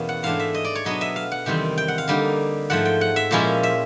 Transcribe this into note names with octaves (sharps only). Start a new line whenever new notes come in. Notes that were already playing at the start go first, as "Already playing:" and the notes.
Already playing: E2 B2 A#3 C#4 A5
F#5
G#2 E3 A3 D4 F5
E5
D#5
D5
C#5
B2 F#3 B3 D4 D#5
E5
F5
F#5
E2 C3 D#3 G3 C4
G5
F#5
F5
D3 G3 A#3 D#4
G#2 F3 A3 F#5
G5
F#5
E5
A#2 F3 G#3 C#4 E4
E5